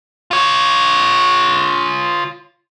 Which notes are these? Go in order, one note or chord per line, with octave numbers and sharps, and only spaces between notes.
F4 C#5